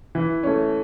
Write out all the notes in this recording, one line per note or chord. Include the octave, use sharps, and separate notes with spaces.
E3
A3 C#4